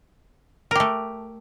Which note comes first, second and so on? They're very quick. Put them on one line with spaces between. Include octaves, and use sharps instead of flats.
A#4 G4 A3